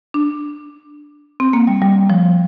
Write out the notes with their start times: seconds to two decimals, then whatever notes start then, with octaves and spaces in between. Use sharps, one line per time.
0.14 D4
1.40 C4
1.53 A#3
1.67 G3
1.82 G3
2.10 F3